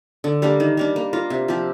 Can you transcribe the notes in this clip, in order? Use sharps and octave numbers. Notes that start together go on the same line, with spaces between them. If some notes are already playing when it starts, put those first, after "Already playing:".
D3
G3 A#3 D4
D#3
G3 A#3 D4
A#3
F4 A#4
C3
F3 C4 G4